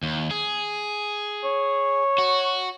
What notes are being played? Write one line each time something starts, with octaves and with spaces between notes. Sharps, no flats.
D#2
G#4
C#5
F#4